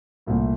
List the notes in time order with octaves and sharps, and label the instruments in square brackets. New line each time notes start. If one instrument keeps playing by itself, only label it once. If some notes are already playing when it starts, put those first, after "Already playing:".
[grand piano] C2 A#2 A3 C4